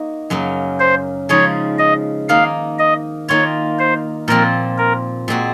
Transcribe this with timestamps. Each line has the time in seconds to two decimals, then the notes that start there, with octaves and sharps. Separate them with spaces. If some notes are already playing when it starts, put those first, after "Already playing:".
Already playing: A#3 D#4 F#4
0.30 F#2 C#3 F#3 A#3
0.79 C5
1.29 C#3 F3 G#3 D#4 C#5
1.79 D#5
2.29 D#3 A#3 D#4 F5
2.79 D#5
3.29 D#3 A#3 F4 C#5
3.79 C5
4.28 A#2 F3 C4 A#4
4.78 A#4
5.28 A#2 G#3 C4 F#4